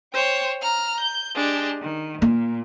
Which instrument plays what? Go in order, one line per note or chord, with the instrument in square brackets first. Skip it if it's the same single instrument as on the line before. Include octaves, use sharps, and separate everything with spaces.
[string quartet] C5 C#5 G5
A#5 F6
G6
G#3 D4 G4
D#3
[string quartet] A#2 [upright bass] A#3